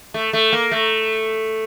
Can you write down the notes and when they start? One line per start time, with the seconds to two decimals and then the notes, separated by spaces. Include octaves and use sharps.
0.14 A3
0.33 A3
0.53 A#3
0.71 A3